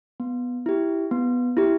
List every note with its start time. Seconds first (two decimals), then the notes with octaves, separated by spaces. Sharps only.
0.20 B3
0.66 E4 G4
1.11 B3
1.57 E4 G4